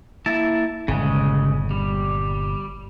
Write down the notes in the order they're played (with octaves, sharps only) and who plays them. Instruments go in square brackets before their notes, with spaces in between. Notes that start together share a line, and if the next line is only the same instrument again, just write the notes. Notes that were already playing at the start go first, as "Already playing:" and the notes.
[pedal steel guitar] A#3 E4 A5
[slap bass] G1 A#2 [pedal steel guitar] C#3 G#3
[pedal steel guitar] G3